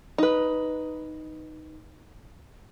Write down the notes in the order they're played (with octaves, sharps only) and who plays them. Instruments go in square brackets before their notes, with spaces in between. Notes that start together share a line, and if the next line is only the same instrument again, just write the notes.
[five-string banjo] D#4 B4